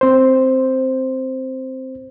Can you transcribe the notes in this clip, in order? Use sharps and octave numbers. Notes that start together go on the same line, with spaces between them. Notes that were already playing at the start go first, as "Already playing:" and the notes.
C4 C5